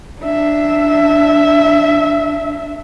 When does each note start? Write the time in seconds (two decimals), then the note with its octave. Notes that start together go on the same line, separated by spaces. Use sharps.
0.22 D4 E5